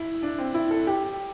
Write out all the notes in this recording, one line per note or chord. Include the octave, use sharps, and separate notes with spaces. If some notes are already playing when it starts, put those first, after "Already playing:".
Already playing: E4
D4
C4
E4
A4
G4